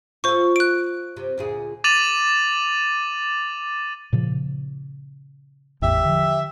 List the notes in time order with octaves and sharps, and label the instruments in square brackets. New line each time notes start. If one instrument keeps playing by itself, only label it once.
[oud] F4 A4 [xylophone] C5 C#6
[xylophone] F#6 D7
[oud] C3
D2 A#2 G#4
[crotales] D6 A6 D#7 F7 F#7
[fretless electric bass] A#2 C#3 F3
[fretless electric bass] G#1 E2 A2 [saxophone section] G4 E5
[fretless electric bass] D3 F3